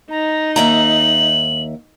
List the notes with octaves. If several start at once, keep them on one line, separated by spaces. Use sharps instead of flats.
D#4 A#5
D#2 E5 A#5 F#7